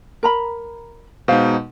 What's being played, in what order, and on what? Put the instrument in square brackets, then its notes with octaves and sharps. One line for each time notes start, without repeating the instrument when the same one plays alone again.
[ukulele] A#4 A#5 B5
[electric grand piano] B2 G#3 D#4 [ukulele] C5 F5